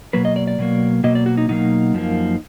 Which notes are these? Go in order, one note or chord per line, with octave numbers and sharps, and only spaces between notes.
B2 F#3 A#3 B4
D#5
D5
D5
B2 F#3 A#3
B2 F#3 A#3 D#5
D5
F#4
D#4
B2 F#3 A#3 D#4
F#2 F3 A#3